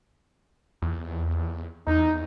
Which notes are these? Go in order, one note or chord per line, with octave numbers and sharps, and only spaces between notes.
E2
E2 D#4